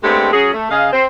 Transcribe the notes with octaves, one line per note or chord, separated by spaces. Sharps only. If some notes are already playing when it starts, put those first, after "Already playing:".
G#3 A3 B3 C4 D4 G4
F#3 C#4 F#4 G#4
A3
C#3 G#4 D#5 F5
C4 C5